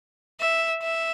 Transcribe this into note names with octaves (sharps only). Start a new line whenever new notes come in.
E5
E5